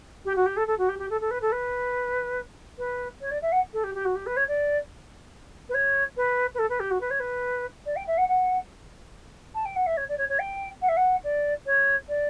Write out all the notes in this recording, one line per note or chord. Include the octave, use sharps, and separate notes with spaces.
G4
F#4
G4
A4
A4
F#4
G4
G4
A4
A4
B4
A4
B4
B4
C#5
D5
E5
F#5
A4
G4
G4
F#4
G4
B4
C#5
D5
B4
C#5
B4
B4
A4
B4
G4
F#4
B4
C#5
B4
D5
G5
E5
F#5
F#5
A5
G5
F#5
E5
C#5
D5
C#5
C#5
G5
F#5
E5
F#5
D5
C#5
D5